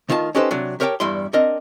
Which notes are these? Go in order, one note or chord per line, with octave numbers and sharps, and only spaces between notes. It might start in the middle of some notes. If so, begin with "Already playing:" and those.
D2 D#3 F4 C#5 A5
C#4 D#4 G4 A4 B4 C5
C3 F#3 D4
G4 A#4 C#5 E5 G5 A5
E2 G2 G3 E4 C6
C4 D4 A#4 D#5